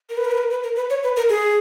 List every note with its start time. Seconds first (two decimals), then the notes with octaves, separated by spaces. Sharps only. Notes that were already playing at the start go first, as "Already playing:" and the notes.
0.10 A#4
0.17 B4
0.25 A#4
0.31 B4
0.38 A#4
0.50 B4
0.63 A#4
0.76 B4
0.90 C#5
1.03 B4
1.16 A#4
1.29 G#4